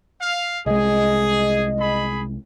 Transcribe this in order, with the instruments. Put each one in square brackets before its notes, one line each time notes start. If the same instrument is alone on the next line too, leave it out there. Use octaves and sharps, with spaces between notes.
[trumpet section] F5
[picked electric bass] C2 G#3 [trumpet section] G#4 [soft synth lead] D#5
[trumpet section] G#4 B5